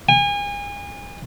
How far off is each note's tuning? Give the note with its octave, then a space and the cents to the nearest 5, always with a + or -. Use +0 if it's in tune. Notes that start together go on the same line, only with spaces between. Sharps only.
G#5 -35